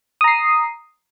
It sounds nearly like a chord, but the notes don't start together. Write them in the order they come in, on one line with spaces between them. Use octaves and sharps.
D#6 A#5 C7